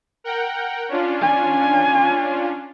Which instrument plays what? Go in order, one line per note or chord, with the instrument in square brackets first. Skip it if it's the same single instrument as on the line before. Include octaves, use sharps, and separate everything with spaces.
[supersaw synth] A#4 F#5 G5
C#4 D4 F4
[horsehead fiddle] G#5